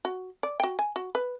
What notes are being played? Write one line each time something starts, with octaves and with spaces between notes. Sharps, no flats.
F#4
D5
F#4 G5
G#5
F#4
B4